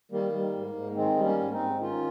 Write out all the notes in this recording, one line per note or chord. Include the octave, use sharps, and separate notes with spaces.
D#3 G3 A#3
G3
G#2
G#2
D#3 G#3 C4
G3
A#3 C#4
G#2
C4 D#4
G#2
D#3 C#4 F4